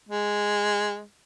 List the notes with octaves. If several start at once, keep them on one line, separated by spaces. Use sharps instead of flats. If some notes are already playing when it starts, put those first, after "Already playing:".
G#3